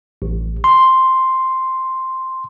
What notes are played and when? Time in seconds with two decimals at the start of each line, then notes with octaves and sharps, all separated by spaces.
0.22 A1
0.64 C6